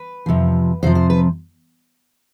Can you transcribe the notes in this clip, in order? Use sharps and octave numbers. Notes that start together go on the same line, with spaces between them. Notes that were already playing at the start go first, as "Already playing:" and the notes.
Already playing: B4
F2 C3 F3
F2 C3 F3 C5
C5
B4